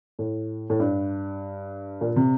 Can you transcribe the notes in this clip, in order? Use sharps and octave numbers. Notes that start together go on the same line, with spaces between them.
A2
A2
G2
A#2
C3